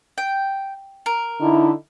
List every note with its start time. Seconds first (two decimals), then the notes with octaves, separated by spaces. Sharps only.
0.18 G5
1.06 A#4
1.40 D3 D#4 E4